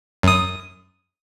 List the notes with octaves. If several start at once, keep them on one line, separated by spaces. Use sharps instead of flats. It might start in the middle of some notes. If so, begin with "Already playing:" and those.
F#2 D#6